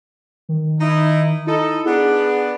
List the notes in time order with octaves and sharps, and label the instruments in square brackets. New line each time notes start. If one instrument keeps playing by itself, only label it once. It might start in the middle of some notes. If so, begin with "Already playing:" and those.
[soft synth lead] D#3
[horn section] D#4 E4
[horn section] D#4 A4 [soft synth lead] E4
[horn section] B3 D4 [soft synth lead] G#4